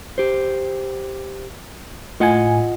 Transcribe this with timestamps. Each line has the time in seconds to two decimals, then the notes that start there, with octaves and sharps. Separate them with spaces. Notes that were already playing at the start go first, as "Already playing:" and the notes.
0.18 G4 C5
2.20 A2 F4 D#5 F#5 G#5